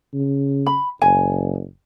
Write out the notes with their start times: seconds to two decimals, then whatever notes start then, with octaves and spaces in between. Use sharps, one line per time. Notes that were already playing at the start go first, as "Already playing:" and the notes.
0.14 C#3
0.67 B5
1.02 F#1 G#5